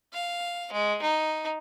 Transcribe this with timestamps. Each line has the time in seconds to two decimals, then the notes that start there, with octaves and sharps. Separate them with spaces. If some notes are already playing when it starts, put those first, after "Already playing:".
0.13 F5
0.72 G#3
1.02 D#4